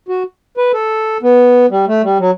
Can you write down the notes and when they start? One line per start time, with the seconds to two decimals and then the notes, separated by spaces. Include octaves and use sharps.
0.09 F#4
0.57 B4
0.74 A4
1.22 B3
1.71 G3
1.87 A3
2.03 G3
2.20 F#3